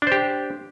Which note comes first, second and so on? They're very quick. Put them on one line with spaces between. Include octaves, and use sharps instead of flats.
D4 C5 G4